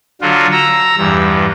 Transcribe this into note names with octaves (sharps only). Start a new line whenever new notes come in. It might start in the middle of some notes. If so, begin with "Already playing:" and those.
D3 F#3 F4 F#4
A#5 E6
E2 G2